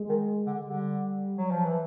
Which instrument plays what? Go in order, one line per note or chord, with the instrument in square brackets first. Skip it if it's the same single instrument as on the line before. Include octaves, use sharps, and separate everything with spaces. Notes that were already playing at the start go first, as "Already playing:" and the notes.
Already playing: [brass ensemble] G#3
[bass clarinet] D#3
D3
[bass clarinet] D3 [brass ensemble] G3
[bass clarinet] F#3
F3
E3